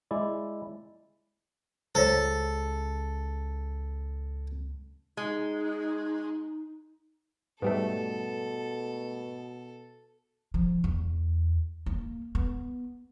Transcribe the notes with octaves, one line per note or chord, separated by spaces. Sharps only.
G#3 E4 D5
C#2 A4 C5 C#5
G#3 D#4
G#2 B2 G3 A3 A4 B4
F3
E2
A#3
B3